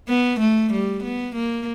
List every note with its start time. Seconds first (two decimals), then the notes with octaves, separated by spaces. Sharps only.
0.08 B3
0.40 A3
0.72 G3
1.03 B3
1.35 A#3